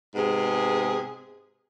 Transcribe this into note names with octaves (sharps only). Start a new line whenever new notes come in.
G#2 C3 B3 G#4